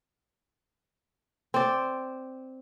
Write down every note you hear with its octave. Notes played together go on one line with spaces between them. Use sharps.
C4 D5